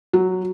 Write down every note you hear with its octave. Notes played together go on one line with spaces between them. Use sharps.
F#3